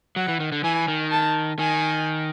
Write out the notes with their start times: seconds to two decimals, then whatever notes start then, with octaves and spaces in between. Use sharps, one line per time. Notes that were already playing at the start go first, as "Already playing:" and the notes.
0.16 F#3 F#5
0.28 E3
0.40 D#3
0.52 D3
0.64 E3 G#5
0.88 D#3
1.11 A5
1.59 D#3 G#5